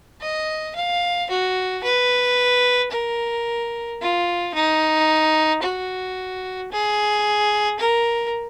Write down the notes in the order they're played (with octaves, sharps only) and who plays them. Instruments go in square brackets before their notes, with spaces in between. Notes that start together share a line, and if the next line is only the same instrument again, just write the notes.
[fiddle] D#5
F5
F#4
B4
A#4
F4
D#4
F#4
G#4
A#4